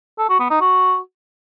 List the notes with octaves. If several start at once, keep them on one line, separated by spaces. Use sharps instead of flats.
A4
F#4
B3
D#4
F#4